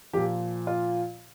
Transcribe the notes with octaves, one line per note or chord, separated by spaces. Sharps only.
A#2 F3 G4
F4